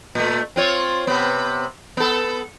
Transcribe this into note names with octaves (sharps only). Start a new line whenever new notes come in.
A#2 A3
C4 F4 C#5
C3 B3
B3 A4